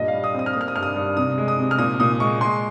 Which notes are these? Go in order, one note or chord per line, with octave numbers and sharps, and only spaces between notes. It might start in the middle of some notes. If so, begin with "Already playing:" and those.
Already playing: G2 A#2 D#5
F5
G3
D#6
C4 D#6
F6
A#3 D#6
F6
D#6
G2 F6
D#6
G2
C3 D#6
G#3
D#6
C3
F6
A#2 D#6
A#2 D#6
G#3 C#6
G#3 C6